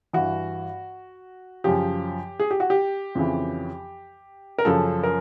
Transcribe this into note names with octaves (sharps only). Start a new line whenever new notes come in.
G2 E3 F#4
F#2 C#3 F3 G4
G#4
G4
F#4
G4
F2 C#3 E3
A#4
F#2 C#3 F3 A4
A#4